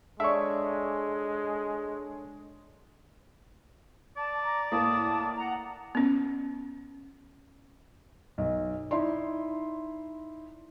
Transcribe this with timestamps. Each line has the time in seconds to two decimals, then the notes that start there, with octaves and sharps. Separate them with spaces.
0.20 G#3 D4 A4 C#5 D5 E5 C#6
4.17 D5 A5
4.44 A#5
4.72 A2 A#3 A5 D#6
5.37 F#5 A#5
5.95 B3 C#4
8.38 B1
8.91 D#4 E4 D5 C6